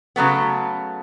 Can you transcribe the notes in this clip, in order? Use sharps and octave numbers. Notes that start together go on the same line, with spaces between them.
C#3 F#3 A3 B3